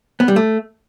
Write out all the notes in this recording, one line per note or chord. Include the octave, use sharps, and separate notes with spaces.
B3
G3
A3